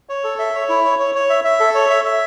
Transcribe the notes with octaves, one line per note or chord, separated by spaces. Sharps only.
C#5
A4
E5
C#5
E4
C#5
C#5
C#5
E5
E5
A4
C#5
E5
E5